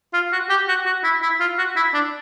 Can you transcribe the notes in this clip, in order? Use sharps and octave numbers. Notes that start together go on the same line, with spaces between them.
F4
F#4
G4
F#4
F#4
E4
E4
F4
F#4
E4
D4